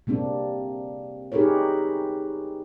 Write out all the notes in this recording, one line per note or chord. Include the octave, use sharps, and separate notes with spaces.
C3 A#3 C4 D4
D#4 G4 G#4 A#4 B4 C#5